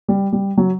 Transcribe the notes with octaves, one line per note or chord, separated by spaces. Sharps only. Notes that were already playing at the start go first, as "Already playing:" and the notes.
G3
G3
F#3